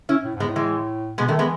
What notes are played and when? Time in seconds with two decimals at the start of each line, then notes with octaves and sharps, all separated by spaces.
0.09 C#4 E4
0.24 A2
0.35 G#2
0.40 G#3 B3
0.46 A2
0.56 E3 G#3
1.18 B2 G#3 B3
1.28 D#3 F#3 A3
1.39 E3 G#3 B3